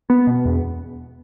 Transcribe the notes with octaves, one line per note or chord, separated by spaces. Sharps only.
B3
B2
E2